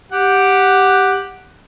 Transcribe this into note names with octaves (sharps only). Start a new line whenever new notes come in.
G4 F#5